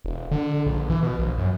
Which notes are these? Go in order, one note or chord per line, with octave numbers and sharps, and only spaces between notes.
E1
D3
A#1
E3
B2
A#1
F#2